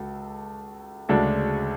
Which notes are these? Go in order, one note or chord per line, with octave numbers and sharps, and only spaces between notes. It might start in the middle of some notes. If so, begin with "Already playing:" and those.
Already playing: C#2 F#4 A4
D2 C#3 G#3 D4 F#4 A4